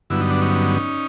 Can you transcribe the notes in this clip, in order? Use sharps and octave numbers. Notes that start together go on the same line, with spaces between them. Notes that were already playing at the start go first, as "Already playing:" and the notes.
G2 D3 F#3 B3 E4
D#4
D4
C#4 D#4